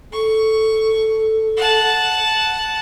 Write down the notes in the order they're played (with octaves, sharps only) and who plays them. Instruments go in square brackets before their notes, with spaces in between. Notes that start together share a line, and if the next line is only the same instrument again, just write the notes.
[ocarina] A4 [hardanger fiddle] C#6
[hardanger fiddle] F#5 A5